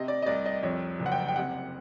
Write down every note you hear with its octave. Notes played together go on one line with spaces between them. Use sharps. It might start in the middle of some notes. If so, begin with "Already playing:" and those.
Already playing: C3 D#5
D5
D#5
C2 D5
D#5
F2 C#5
F#1
F#5
G5
G5
C3 F#5